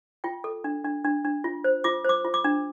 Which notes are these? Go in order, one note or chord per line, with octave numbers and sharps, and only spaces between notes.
F4 G5
A4
D4
D4
D4
D4
F4
C5
F4 D6
C5 D6
F4
D6
D4